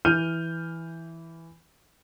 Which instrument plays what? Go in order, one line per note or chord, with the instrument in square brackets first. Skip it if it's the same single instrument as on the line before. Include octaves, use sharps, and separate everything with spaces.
[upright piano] E3 F6 G6 D#7 F7